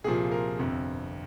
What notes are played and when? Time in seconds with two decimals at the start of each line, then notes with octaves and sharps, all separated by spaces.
0.04 C2 A#2 F3 G#4
0.31 A#4
0.59 G1 F2 C3